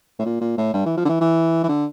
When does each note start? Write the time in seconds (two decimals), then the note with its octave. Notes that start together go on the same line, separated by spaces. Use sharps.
0.19 A2
0.26 A#2
0.41 A#2
0.58 A2
0.74 G2
0.86 E3
0.97 F3
1.05 D3
1.09 E3
1.21 E3
1.64 E3
1.69 D3